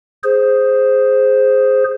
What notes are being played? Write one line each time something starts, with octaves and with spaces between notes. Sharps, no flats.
G#4 C5